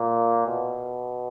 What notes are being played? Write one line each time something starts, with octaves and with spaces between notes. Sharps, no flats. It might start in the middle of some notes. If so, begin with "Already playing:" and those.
Already playing: A#2
B2